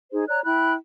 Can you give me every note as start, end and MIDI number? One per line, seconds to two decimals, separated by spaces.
0.12 0.25 63
0.12 0.25 68
0.12 0.25 72
0.28 0.41 73
0.28 0.41 74
0.28 0.41 82
0.28 0.41 90
0.46 0.74 64
0.46 0.74 79
0.46 0.74 83
0.46 0.74 90